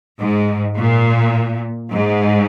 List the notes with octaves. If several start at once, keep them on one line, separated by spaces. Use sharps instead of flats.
G#2
A#2
G#2